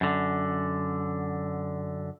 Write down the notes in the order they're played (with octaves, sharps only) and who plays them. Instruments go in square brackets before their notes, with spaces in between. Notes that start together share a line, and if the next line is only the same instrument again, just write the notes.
[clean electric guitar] F#2 D3